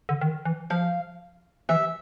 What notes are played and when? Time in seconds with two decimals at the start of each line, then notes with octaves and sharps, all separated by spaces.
0.09 D3
0.21 D#3
0.45 E3
0.70 F3 F5
1.69 E3 E5